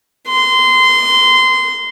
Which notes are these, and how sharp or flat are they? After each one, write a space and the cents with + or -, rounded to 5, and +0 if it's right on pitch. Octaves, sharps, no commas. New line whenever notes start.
C6 -20